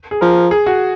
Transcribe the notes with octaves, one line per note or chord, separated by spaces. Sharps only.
G#4
F3 A#4
G#4
F#4